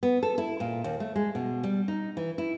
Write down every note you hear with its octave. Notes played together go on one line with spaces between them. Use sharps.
B3
A4
E4
A#2
D#2
A3
G#3
B2
G3
D#4
E3
E4